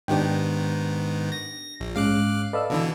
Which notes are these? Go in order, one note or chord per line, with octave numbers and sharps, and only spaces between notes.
G#2 D#3 B3 D4 G4 G5
A#6
A#1
G#2 G#3 C#4 F5 D6 F#6
A4 B4 D5 D#5 F5 E6
B2 D3 E3